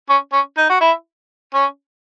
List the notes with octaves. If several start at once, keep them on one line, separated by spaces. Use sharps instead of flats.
C#4
C#4
D#4
F#4
E4
C#4